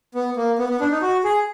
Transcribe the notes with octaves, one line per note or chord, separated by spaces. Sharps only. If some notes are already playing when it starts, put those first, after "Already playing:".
B3
A#3
B3
B3
D4
D#4
F#4
G#4